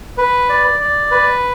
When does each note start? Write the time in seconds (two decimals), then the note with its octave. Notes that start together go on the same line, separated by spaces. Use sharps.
0.18 B4
0.49 D5
0.80 D5
1.11 B4